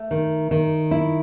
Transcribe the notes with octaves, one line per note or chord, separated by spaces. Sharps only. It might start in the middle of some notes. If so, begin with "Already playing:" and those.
Already playing: A3
D#3
D#3
E4